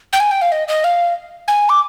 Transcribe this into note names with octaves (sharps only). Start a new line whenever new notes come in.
G5
G#5
G5
F5
D#5
D#5
F5
G#5
D6